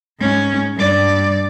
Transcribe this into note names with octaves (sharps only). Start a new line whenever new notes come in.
G#2 C#4
G2 D5